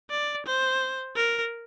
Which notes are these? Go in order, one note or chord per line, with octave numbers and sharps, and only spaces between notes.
D5
C5
A#4